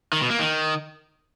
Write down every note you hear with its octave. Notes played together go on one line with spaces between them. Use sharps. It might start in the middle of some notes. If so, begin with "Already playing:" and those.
D#3
B2
A#3
D#3